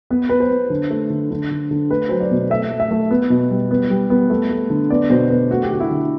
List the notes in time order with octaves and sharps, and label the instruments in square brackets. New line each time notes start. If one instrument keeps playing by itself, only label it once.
[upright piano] B3 B4
B3 B4
C5
B3
D3
A3
D3
D3
D3
D3
A3 B4
F#3 C5
D5
B2
A3 E5
A3
E5
A3
B3
B2
G3
B3
G3
B3
A3
A3
D3
B3 D5
B2 C5
B3 B4
A3 F#4
G4
D3 F#4
E4
D3